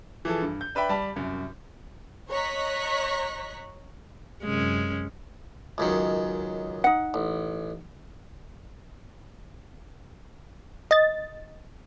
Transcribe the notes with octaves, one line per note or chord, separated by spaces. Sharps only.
E3 F3 G#4 A4
G2
G6
D4 B4 E5 G5 B5
G3 A5 B5
C2 F#2
C#5 D#5 A#5 C#6 F#6 B6
F#2 C3 G#3 C#4
C#2 F#2 D#3
D#4 F#5
A1
D#5 A6